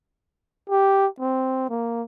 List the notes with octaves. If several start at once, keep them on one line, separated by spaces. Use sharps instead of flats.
G4
C4
A#3